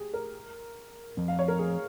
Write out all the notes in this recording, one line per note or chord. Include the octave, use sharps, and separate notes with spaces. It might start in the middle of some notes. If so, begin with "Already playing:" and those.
Already playing: G4 G#4
A#4
F3 C4
F5
C#5
A#4
G#4